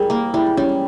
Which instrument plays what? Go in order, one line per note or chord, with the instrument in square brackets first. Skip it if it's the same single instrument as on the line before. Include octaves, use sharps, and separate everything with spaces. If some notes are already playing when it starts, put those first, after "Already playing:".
Already playing: [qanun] G3 [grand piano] G#4 A#4
[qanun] A#3
[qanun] G3 [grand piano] E4
[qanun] G3 [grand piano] C#4